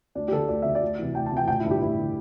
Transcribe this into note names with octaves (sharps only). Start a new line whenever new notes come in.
D2 D4
G4
D3 A4
D2 D5
D3 E5
D5
D2
C3 E3
D2 G5
A5
C3
E3 G5
A1 G5
E4
G2 D3
G4
A1 E4
D3